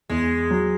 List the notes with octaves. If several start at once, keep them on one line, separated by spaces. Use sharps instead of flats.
E2 G#3
F#3